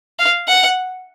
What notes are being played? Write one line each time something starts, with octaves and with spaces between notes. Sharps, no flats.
F5
F#5